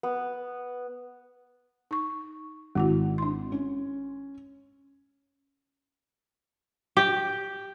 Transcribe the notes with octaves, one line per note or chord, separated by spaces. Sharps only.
B3
D#4 C#6
G#1 G#3 E4 F#4
D4 C6
C#4
G4